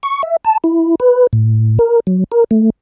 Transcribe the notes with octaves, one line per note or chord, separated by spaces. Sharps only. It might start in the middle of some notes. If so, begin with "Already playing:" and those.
C#6
E5
A5
E4
B4
A2
A#4
F#3
A#4
A3